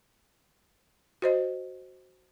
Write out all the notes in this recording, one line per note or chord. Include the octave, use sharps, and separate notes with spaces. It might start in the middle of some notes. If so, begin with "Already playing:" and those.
F#4 C5 D#5